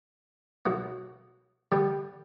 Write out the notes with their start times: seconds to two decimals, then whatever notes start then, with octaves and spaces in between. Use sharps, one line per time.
0.66 B1 B2 F#3 B3
1.72 D3 G3 D4 G4 B4